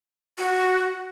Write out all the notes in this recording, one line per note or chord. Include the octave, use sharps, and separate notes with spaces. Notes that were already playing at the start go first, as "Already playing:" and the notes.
F#4